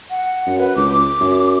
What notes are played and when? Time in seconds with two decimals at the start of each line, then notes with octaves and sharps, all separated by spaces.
0.10 F#5
0.47 F#2
0.59 B4
0.76 C#2 D6
1.20 F#2